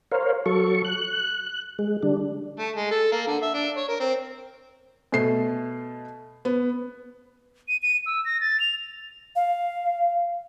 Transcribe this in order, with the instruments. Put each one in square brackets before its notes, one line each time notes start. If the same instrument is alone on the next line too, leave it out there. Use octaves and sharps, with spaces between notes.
[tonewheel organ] A#4 C5 C#5 F5
F#3 A4 C#6
F#6
G#3
D3 G3 D4
[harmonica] A3
G#3
A4
A#3
D3
E5
D4
C#5
A#4
C4
[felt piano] B2 A3 C7
B3
[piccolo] D#7
D#7
E6
A#6
A6
F7
[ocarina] F5